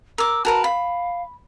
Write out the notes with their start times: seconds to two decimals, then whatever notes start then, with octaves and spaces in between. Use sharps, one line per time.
0.18 A#4 D6 E6
0.45 F#4 A#4 B4 A5
0.64 F5 B5